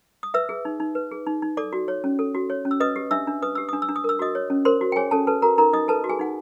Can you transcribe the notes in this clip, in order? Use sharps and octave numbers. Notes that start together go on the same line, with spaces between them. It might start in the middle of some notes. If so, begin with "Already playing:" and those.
D#6
B4 E5 E6
G#4
D#4
D#4
B4
G#4
D#4
D#4
A4 D5 D6
F#4
C#5
C#4
A4
F#4
C#5
C#4
E6
B4 D#5 D#6
G4
D4 E5 E6
D4
B4 D#6
G4 E6
D4 D#6
E6
D4
D#6
A#4 E6
F#4 D#5 D#6
C#5
C#4
A#4 C5 C6
F#4
G5
G#4 C#5 G#5
C#4 A4 A5
A4 B4 A5
F#4 A#4 A#5
D#4 A#4 A#5
D#4 D#5 D#6
A4 B4 A5
F#4
G#4 G#5
D#4 F#5